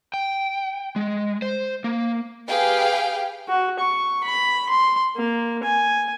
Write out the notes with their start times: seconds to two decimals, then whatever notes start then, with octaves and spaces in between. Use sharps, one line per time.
0.14 G5
0.96 G#3
1.42 C5
1.84 A#3
2.49 G4 G#4 B4 F5 G5
3.49 F#4
3.79 C#6
4.23 B5
4.69 C6
5.16 A#3
5.63 G#5